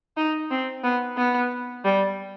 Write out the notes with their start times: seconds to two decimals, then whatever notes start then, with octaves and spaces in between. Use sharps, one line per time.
0.17 D#4
0.51 C4
0.84 B3
1.17 B3
1.85 G3